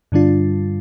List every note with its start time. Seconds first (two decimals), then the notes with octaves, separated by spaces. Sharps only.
0.12 G2 D3 G3 D4 F4